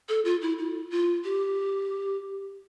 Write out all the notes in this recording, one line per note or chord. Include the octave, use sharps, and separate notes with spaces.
A4
F4
E4
E4
F4
G4